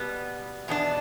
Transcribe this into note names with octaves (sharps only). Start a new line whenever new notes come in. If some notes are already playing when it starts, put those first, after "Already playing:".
Already playing: B2 G3 B3
E2 B2 B3 D4